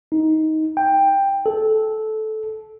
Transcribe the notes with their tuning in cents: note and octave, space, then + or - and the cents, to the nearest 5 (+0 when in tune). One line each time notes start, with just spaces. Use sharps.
D#4 +15
G5 +10
A4 -15